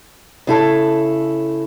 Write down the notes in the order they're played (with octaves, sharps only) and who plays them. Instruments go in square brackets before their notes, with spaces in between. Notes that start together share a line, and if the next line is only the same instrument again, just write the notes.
[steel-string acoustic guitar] C#3 E4 A4